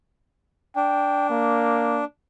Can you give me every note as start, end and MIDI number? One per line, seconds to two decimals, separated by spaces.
0.76 2.04 62
0.76 1.26 79
1.30 2.03 58